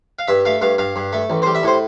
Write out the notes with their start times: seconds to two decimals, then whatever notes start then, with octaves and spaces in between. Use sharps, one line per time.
0.19 F5
0.28 G2 E5
0.45 A3 F5
0.61 G2 F5
0.78 G2 F5
0.96 G2
1.13 A3
1.30 A1
1.42 G3 C5
1.55 E5
1.63 A2 C5